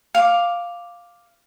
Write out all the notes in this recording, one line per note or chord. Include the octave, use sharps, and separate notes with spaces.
F5 D6